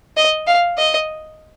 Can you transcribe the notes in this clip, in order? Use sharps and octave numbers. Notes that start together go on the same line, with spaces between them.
D#5
F5
D#5